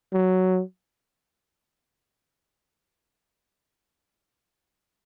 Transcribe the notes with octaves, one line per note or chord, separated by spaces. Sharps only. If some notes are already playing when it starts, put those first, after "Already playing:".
F#3